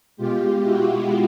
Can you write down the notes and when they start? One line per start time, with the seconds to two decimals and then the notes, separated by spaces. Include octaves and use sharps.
0.17 B2 G#3 F4 G4
0.62 E4 F#4